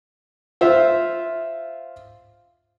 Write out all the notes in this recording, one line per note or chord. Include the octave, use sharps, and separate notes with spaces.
F4 C5 E5 F5